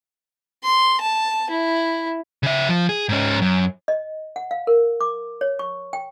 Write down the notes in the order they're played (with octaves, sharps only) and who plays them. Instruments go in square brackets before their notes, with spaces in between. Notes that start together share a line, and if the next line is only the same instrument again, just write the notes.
[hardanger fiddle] C6
A5
E4
[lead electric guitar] C#3 E5
F3
G#4
G#2 C#4
F#2
[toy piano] D#5
F#5
F5
A#4
D6
C#5
C#6
G5